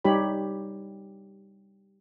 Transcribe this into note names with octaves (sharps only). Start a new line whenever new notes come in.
G3 D#4 G4 C#5 B5